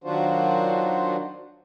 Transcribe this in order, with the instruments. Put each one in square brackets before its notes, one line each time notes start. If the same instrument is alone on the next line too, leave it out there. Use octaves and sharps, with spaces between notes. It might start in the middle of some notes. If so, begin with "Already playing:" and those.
[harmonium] D#3 F#3 D4 F4 F#4 C5